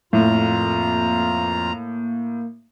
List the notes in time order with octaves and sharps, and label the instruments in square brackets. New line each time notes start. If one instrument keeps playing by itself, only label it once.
[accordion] F2 F4 [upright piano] A2 [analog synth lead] A#3 [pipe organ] A#5